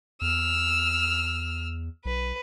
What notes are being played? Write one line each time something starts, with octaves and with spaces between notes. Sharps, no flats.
E2 E6 F6
B1 B4